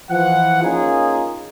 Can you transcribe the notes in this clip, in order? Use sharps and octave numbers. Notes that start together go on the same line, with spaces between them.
E3 F3 F#5
A#3 C#4 D#4 F4 G#4